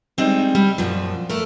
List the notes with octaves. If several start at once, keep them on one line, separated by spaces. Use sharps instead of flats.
G3 G#3 C4 D#4
G3
F#2 A#2 F3
A3 A#4